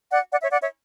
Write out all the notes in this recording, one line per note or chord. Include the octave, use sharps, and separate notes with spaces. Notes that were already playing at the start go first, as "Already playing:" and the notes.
D5 F#5
D5 F#5
C#5 E5
D5 F#5
C#5 E5